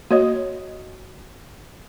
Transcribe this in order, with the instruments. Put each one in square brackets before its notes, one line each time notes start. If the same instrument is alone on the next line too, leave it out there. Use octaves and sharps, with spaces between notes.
[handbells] A#3 C#5 D#5 [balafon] F#4